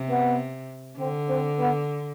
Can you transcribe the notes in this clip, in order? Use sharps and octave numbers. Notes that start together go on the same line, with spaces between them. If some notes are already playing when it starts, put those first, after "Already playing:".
Already playing: C3
B3
D3 C4
C4
B3